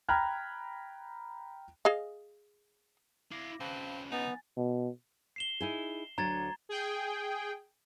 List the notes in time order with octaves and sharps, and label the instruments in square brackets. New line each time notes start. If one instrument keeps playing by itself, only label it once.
[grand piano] G5 A#5 B5 F6 F#6 G#6
[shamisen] G#4 D#5 F5
[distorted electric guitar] E4 F5 [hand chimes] D6 A#6
[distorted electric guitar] C#3 B4 [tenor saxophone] C4 [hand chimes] F5 A5 B5
[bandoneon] B3 [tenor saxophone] D#4 [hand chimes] G#5 A6
[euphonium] B2
[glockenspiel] C7 E7 G7
[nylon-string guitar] D#4 E4 G#4
[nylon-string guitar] D2 F#3 D4 [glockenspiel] A#5 G#6 A6
[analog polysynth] G#4 G5